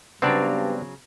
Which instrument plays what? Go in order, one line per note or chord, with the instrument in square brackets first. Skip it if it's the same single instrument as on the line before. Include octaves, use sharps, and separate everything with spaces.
[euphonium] G2 [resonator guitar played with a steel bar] C#3 F#3 [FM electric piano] B3 [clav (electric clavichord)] C4 D4 D5